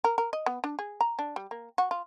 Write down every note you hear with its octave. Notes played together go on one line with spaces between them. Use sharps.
A#4
A#4
D#5
B3
D4
G#4
A#5
D4
G3
A#3
F#4
F4